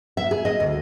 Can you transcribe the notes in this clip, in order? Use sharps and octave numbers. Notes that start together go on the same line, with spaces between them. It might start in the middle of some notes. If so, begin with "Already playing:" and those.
E5
G#4
D#5
D2